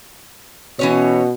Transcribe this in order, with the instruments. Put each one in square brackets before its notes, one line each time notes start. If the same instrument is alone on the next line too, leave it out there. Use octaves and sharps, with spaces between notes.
[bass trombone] B2 [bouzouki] E3 C#4 C#5